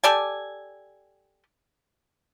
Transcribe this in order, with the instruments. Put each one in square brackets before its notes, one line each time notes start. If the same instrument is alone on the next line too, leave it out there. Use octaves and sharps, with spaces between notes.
[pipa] G4 A4 D5 G#5